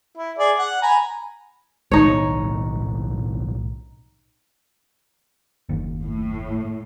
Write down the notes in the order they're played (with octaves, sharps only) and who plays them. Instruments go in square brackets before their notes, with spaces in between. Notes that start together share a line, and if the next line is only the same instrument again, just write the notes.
[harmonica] E4
G#4 D5
F#5
G#5 A#5 B5
[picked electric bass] B1 A2 D#3 [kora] D#4 C#5
[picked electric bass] F#1 D#2
[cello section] A2